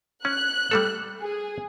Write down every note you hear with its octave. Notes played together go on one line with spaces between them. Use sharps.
C#4 F#6
G3 A3 A4
G#4